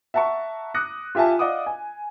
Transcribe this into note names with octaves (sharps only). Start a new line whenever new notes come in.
E5 F#5 A5 A#5 C#6
D6 D#6 F#6 A#6 C#7
F4 G4 E5 G#5 A5
D5 D#5 F5 F#5 D6 D#6
G#5